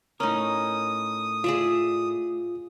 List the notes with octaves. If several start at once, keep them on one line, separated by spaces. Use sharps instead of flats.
A2 C#4 D#4 A#4 D#6
F4 G#4 D5 E5